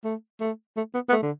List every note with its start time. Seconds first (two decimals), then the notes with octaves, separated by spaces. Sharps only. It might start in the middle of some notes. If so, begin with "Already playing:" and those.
0.04 A3
0.40 A3
0.77 A3
0.94 B3
1.09 B3
1.12 A3
1.22 D3